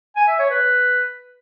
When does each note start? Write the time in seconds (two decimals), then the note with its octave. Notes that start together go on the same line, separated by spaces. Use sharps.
0.16 G#5
0.28 E5
0.39 C#5
0.50 B4